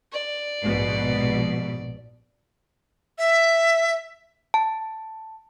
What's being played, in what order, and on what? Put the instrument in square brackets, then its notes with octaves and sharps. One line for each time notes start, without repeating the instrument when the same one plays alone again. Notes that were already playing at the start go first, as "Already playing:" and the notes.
[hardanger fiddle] D5
[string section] A#1 G#2 B2
[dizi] E5
[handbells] A5